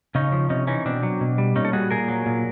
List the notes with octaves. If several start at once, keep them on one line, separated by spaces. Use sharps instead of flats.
C#3 C#4 D#4
F3
C3 C#4 D#4
E3 C#4 D#4
B2 C4 D4
F#3
B2
G3
A#2 C#4 D#4
A4
G3 F#4 G#4
A#2 G#4 A#4
F#3
A#2